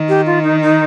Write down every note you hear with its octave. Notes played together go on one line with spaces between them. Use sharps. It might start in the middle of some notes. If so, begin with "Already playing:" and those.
Already playing: D#3
G4
F4
D#4
D#4